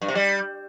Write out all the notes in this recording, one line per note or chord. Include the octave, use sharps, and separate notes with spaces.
G2
C3
G3